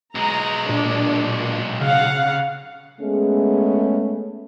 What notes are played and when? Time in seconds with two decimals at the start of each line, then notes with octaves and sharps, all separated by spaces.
0.15 B1 G#3 A#5
0.69 A#2 D4
1.81 C#3 F5 F#5
3.02 G#3 A3 B3 C#4 G#4